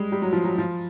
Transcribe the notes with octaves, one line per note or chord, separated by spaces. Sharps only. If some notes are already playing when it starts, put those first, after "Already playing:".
Already playing: G3 G#3
G3
F#3
F3
F#3
F3